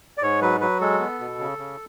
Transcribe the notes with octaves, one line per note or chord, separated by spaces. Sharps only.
D5
G#2 C#5
F#3 B4
F#3 B4
G#3 A4
B3
B2
C#3
C#3